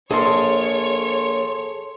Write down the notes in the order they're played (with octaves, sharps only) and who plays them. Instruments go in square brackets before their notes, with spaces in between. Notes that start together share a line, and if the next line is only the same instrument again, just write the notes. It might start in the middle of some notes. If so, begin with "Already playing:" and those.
[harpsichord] A#1 [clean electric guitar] G#4 A4 C5 [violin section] C#5